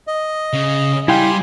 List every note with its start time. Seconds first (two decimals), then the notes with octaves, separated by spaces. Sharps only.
0.07 D#5
0.53 C#3
1.08 G3 E4 F5 G5 G#5 C6